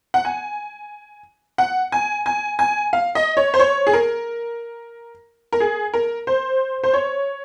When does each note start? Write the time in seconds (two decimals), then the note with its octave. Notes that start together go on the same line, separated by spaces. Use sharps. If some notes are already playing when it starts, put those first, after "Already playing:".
0.14 F#5
0.25 G#5
1.58 F#5
1.92 G#5
2.26 G#5
2.59 G#5
2.93 F5
3.15 D#5
3.37 C#5
3.54 C5
3.59 C#5
3.87 G#4
3.93 A#4
5.53 A#4
5.60 G#4
5.94 A#4
6.27 C5
6.84 C5
6.94 C#5